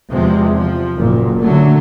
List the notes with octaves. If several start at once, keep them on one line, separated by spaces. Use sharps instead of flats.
E2 C3 F3 G#3
F3
F#1 A#2
D3 F#3 A3